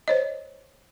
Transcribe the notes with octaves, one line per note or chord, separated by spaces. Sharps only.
C5 C#5 D#5